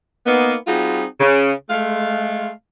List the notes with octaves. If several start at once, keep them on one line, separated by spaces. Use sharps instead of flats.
A#3 B3 D#4
G3 C4 D#4 F4 F#4 G#4
C#3
G#3 A3 F5